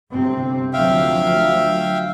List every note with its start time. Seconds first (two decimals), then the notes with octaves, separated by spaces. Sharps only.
0.11 G1 C3 C4
0.73 D2 F3 F#3 E5 F5 G5